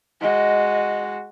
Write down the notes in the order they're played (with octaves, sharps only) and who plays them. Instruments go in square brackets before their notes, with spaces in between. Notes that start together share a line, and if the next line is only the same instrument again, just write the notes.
[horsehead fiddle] G#3 F#4 [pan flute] D#5